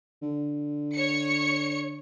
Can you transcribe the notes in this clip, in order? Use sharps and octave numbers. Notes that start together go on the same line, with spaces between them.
D3
C#5 C#7